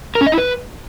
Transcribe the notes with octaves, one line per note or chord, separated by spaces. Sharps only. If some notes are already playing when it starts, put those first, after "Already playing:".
A#4
C#4
D#5
E4
B4